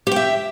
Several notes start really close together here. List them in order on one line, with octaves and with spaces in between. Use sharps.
G4 G5 E5